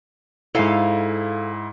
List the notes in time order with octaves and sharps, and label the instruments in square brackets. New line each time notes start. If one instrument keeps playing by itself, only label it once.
[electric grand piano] G#2 E4 [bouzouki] A4 F5 G#5